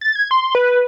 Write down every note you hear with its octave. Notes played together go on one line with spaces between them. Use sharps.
A6
G#6
C6
B4